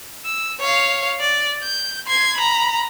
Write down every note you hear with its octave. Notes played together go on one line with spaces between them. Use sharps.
E6
C#5 F5
D5
G6
C6 G#6
A#5 B5